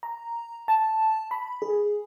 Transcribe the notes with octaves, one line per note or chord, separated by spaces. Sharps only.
A#5
A5
B5
G#4